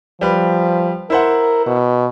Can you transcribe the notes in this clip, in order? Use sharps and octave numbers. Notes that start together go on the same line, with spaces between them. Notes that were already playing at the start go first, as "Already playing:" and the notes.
F3 G3 B4
E4 A#4 C5 F#5
B2